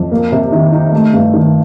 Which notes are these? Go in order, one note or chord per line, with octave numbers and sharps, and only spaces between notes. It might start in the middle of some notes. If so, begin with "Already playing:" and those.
Already playing: F2
A#3
C3
D#3
D#4
A3
G2
D#3